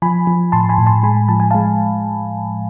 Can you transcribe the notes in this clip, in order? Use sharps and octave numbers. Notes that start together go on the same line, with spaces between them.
F3 G#5 B5
F3
A2 A5 C6
G#5 B5
A2
A5 C6
G#3 G#5 B5
F3 A5
G#5
G#3 F5 A5